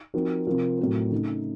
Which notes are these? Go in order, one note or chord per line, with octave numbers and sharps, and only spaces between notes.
F3 C4 D#4 F#4 A#4
C3 F3 C4 F4 A#4
A2 F#3 C4 F#4 A#4
C#3 A3 D#4